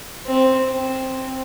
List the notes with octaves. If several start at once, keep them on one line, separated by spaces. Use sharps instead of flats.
C4
C4